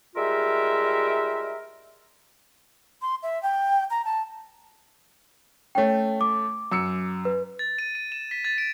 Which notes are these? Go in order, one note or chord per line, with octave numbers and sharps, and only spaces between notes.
G3 G#3 F4 G4 A#4 E5
C6
E5
G5
A#5
A5
A3 C#4 C#5 G5
D6
F#2 E6 C#7
B4
A6
D#7
D#7
E7
B6
A6
D7